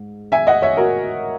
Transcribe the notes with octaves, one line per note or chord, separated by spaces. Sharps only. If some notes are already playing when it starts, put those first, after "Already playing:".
Already playing: G#2
E5 G#5
D#5 F#5
C#5 E5
F#4 A#4